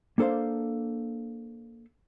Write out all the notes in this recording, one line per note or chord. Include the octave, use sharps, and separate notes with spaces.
A#3 D4 A4 C5 F5